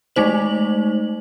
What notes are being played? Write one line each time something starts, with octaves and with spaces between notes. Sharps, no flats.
G#3 A3 D#4 C5 F#7